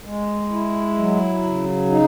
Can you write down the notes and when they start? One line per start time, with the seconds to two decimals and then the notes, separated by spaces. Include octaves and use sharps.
0.05 G#3
0.51 E4
0.98 F#3
1.44 C#3
1.90 D#4